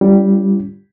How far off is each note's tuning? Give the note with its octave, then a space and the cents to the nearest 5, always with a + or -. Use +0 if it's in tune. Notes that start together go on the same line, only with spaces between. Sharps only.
G3 +0 C#4 +25 F4 -45